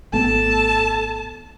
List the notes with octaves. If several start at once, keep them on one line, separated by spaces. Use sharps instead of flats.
G#1 A3 B3 A4 A5